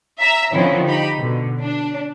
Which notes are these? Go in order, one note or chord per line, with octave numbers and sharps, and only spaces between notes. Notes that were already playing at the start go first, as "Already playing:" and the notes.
E5 A#5 E6
D3 D#3 F3 C4 C#4 E4
D#4 G4 B5
B2 D3
D4